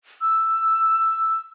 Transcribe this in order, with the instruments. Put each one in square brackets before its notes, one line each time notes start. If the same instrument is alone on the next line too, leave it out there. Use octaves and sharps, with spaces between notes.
[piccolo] E6